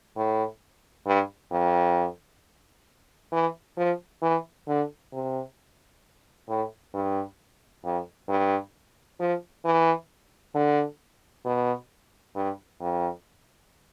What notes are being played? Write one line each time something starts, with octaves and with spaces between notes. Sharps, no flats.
A2
G2
F2
E3
F3
E3
D3
C3
A2
G2
F2
G2
F3
E3
D3
B2
G2
F2